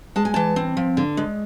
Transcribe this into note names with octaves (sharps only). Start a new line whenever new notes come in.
G#3 A5
G#5
E3 A5
C4
F3
D3
G#3